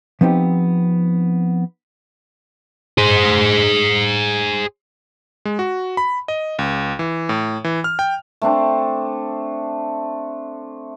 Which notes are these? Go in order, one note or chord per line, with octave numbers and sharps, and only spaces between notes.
F3 B3 C4 D#4 G4
G#4 C5
G#3
F#4
B5
D#5
C#2
E3
A2
E3
F6
G5
A3 C4 D4